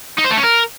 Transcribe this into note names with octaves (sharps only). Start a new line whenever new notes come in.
D#4
C5
A3
C#4
A#4